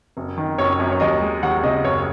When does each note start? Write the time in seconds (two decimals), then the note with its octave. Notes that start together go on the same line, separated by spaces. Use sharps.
0.17 F#1
0.38 D#3
0.58 F#1 C#5
0.80 F#2
0.92 C#5
1.00 D#2 D#5
1.21 G#3
1.43 D#2 F#5
1.63 C#3 D#5
1.84 F#1 C#5